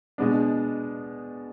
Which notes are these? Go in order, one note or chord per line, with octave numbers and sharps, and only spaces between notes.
B2 G#3 B3 D4